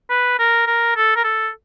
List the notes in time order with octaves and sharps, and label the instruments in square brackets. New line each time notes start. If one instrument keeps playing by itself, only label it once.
[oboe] B4
A#4
A#4
A4
A#4
A4